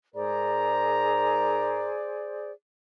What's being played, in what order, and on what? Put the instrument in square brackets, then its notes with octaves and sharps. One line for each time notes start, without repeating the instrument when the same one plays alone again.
[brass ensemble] G#2 A#4 A#5 [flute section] G#4 C5 D5